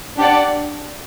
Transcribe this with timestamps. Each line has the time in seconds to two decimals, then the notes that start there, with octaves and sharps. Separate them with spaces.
0.17 D4 G4 D5 F#5